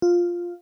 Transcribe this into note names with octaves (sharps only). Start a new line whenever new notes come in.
F4